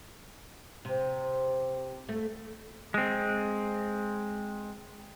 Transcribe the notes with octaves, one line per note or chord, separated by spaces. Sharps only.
C3
A3
G#3 C4